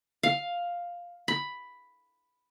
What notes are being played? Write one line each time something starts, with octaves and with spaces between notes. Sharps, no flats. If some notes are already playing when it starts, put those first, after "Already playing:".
F5
B5